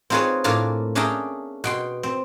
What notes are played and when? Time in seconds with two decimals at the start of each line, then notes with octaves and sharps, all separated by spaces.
0.10 C4 D#4 F4 G#4 B4 C#5
0.44 A2 A#3 D4 F4 G#5
0.95 C#4 D4 G#4 E5 G5 A#5
1.64 B2 G5 C6
2.03 C4